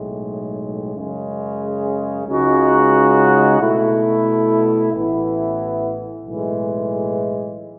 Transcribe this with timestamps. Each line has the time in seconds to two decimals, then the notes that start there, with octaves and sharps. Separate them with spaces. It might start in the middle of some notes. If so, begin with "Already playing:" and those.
Already playing: B1 A2 G#3
0.93 F#2 C#3 G#3
2.26 C#2 C#3 G#3 D#4 F#4
3.58 B2 A3 E4
4.92 A1 A2 E3 B3 E4
6.25 B1 A2 E3 G#3